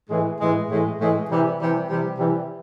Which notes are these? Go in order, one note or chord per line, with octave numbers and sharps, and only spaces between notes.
A2 E3 G#3
A2 E3 G#3
A2 E3 G#3
A2 E3 G#3
C3 E3 G3
C3 E3 G3
C3 E3 G3
C3 E3 G3